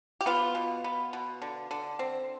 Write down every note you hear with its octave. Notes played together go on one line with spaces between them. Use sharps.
G4
B3 F4
B2
B3
B2
D3
D3
C4